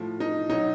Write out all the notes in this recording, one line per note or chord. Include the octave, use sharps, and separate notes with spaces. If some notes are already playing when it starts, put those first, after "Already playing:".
Already playing: A2 F3
D#4
B2 F#3 D#4